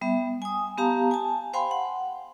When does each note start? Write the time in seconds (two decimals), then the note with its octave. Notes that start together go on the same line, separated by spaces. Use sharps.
0.01 G3 B3 E5
0.42 G#5 D#6
0.78 B3 G4 F5 A5 A#5
1.11 G#5 A5
1.53 C5 F5 G5 G#5 B5 C6
1.71 F#5